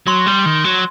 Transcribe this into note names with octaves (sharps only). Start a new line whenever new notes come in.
F#3 C6
G3
D#3
F#3